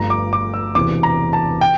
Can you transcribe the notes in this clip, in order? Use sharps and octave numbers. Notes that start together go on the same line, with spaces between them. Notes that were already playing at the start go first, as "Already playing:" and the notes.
Already playing: G1 G2 F3 A3 A#5
D6
D6
E6
E1 E2 C3 D6
A#5
A5
G5